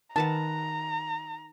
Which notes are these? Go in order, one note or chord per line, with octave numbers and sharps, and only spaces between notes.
D#3 B4 F#5 A5 A#5